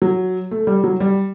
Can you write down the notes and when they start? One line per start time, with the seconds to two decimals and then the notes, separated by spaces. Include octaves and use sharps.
0.02 F#3
0.51 A3
0.67 G3
0.84 F#3
1.00 G3